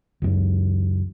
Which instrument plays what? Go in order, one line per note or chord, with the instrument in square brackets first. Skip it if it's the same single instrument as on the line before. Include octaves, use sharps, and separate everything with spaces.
[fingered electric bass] C#2 F#2